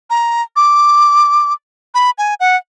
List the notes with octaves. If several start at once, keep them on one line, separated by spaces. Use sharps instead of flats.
A#5
D6
B5
G#5
F#5